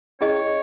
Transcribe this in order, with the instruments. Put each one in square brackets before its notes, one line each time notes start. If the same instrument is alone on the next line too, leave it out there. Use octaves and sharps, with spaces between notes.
[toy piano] C#4 E4 G#4 D#5 [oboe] C#5